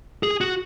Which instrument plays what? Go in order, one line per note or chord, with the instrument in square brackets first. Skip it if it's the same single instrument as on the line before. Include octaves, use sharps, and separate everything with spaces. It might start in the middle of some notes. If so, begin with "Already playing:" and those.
[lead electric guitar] G#4
F#4